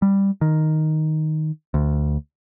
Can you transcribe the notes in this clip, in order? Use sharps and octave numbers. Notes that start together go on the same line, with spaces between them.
G3
D#3
D2